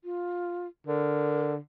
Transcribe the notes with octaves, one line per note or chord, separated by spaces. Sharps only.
F4
D3 A#4